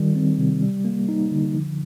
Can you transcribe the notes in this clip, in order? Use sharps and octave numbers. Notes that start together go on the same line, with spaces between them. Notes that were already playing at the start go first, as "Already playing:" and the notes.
Already playing: D#3 G3
C4
C3
G3
A#3
D#4
D3
F3